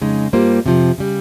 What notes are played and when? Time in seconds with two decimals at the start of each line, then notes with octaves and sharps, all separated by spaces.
0.01 F2 C#3 G#3 D#4
0.32 G2 G3 A#3 F4 C5
0.65 F2 C3 F3
0.98 C#3 G3